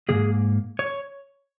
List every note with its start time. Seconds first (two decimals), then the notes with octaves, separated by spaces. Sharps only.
0.09 G#2 D#3 A#3 G#4
0.79 C#5